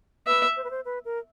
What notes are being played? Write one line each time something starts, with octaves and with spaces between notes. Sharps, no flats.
B4 E5
C5
B4
C5
B4
A#4